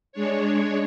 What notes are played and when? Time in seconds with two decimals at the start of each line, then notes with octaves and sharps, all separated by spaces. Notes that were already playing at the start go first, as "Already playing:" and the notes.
0.12 G#3 D4 C#5